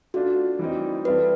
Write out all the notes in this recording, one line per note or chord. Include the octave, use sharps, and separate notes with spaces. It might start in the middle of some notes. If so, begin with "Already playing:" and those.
A3 D4 F4 F#4
E3 G3 C4 D#4
G3 C4 E4 A4 B4